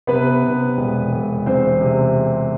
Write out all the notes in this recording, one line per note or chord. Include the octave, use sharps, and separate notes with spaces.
C3 B3 B4
C3
E1
E1
E2 C4 C5
C3